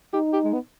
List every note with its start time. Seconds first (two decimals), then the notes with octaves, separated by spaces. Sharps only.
0.13 D#4 G4
0.33 G4
0.44 G#3
0.53 B3